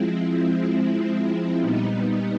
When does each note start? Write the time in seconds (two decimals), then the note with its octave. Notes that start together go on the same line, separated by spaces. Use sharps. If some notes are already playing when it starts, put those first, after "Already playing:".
Already playing: F3 G#3 C4 E4
1.60 A#2 G3 B3 D#4